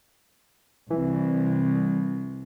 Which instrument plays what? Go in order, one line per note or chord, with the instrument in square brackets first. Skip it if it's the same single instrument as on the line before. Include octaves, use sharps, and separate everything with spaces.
[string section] C2 [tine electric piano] E3